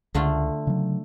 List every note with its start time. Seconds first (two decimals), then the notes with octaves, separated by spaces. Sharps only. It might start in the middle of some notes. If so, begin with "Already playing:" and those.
0.14 C#2 D3 A3 F4
0.67 C#3 F#3